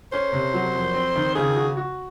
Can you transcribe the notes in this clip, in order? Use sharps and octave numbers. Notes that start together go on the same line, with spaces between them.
C#4 C5
C3
F#3
F2
C4
D#3
C#3 G#4
F#4
F#4